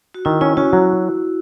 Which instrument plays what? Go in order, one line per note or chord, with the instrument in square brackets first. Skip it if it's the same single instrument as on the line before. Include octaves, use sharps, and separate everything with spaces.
[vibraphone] F#4
[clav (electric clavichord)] D#3 [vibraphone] E4
[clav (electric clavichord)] C#4 [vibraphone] E4
[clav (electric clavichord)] C#4 [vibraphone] F#4
[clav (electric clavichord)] F#3